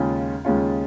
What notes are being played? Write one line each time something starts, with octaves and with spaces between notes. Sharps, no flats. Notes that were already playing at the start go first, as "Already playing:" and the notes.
Already playing: D#2 C#3 G#3 C#4 F4
D#2 C#3 G#3 C#4 F4